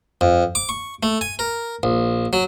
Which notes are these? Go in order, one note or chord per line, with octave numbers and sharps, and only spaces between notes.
F2
D6
C#6
A3
G#5
A#4
A#1
F#3